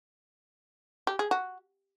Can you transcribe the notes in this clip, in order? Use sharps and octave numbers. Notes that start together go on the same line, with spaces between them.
G4
G#4
F#4